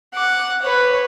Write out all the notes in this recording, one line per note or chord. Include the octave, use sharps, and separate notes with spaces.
F#5 D6
B4 C#5